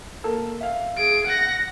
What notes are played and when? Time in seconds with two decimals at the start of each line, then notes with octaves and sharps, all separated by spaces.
0.24 A#3 A4
0.61 E5 F5
0.97 G#4 D7
1.26 F#5 A#6